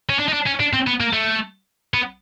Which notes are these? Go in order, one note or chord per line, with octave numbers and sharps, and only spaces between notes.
C#4
D4
D#4
D4
C#4
D4
C4
B3
A#3
A3
B3